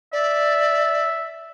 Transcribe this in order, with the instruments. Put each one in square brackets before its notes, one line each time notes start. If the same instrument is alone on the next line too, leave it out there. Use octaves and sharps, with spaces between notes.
[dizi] D5 [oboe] E5